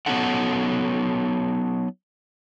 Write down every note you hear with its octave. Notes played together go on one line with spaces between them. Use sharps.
F#3 B3 C#4 D#4 A4 F#5